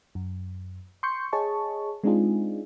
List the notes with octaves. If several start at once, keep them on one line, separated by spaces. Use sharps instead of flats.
F#2
C6 C#6 G6 C#7
G#4 C#5 D#5 A5 C#6
G#3 C4 D4 D#4 F4 G#4